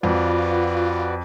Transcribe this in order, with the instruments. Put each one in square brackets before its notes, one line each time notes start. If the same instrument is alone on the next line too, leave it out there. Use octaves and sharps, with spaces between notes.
[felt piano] F2 [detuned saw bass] F4 [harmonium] F#4 B4 D5